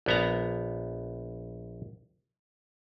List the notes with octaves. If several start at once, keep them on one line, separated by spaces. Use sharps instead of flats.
A#1 B3 A#5